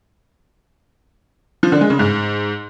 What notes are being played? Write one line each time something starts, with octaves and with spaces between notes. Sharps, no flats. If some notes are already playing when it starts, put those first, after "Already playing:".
F3
D3
G#3
C#3
G#2